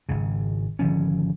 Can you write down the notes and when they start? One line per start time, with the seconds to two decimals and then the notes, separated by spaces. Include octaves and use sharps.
0.09 G#1 G#2 C#3
0.79 G#1 D3 F3 C#4